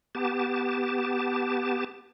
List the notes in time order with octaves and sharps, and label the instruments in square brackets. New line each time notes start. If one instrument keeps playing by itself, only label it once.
[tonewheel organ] B3 G4 A5